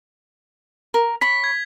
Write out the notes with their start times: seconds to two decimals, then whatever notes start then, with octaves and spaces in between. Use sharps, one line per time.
0.94 A#4
1.21 C#5 B5 B6
1.44 G#6